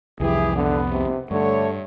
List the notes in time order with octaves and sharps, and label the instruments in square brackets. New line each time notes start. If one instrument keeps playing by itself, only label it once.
[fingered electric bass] C2 F2 [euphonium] E3 [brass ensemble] E4 G4 G#4
[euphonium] D3 [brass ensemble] B3
[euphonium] C3
[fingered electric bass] G2 [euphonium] D3 [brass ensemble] A3 C#5